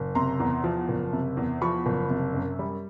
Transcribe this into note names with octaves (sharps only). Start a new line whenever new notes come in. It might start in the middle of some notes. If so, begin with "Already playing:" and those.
Already playing: F#1
C3 A#5 C6
E2
F3
F#1
C3
E2
F3 B5 C#6
F#1
C3
F#2
G3